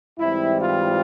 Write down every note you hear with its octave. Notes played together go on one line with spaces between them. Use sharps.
G#2 E3 G3 C4 E4
F4